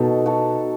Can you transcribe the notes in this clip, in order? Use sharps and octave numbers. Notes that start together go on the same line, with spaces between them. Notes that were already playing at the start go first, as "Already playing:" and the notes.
Already playing: B2 D#4 F#4 A4
F#4 A4